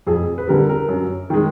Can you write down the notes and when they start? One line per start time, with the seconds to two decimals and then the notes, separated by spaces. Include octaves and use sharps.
0.07 F2 G#4
0.38 B4
0.48 D3 G3 A#4
0.69 A#4
0.89 F#2
1.30 D#3 G#3